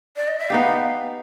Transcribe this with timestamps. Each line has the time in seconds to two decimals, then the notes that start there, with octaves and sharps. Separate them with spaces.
0.16 D5
0.28 D#5
0.39 E5
0.50 B3 D#4 G4 F5